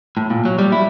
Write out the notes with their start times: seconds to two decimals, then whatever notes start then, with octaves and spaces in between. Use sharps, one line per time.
0.17 A2
0.30 A#2
0.45 F#3
0.59 G3
0.72 E4